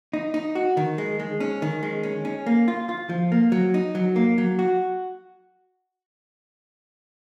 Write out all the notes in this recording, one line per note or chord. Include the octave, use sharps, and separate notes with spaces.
D#4
D#4
F#4
D#3
G#3
G#3
C#4
D#3
G#3
C#4
C#4
A#3
F4
F4
F3
A#3
F#3
D#4
F#3
A#3
F#3
F#4